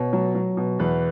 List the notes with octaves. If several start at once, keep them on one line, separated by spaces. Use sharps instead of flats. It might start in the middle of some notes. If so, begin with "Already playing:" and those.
Already playing: B2 C#5
F#3
F#3
B2
E2 B4